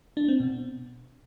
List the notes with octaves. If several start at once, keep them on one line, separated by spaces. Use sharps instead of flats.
D4
C4
B2